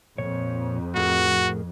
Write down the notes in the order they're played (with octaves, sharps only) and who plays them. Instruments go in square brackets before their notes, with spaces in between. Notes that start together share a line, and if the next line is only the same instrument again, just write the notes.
[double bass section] F2 [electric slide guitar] A#2 C#5
[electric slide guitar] A2 G#4 A#4 [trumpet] F#4